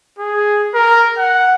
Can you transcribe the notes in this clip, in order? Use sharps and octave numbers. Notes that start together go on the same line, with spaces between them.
G#4
A#4
F#5